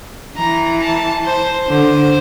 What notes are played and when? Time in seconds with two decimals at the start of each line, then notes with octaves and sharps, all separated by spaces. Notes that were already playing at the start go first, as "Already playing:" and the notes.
0.37 E3 A#5
0.82 A5
1.24 C5
1.69 D3 C5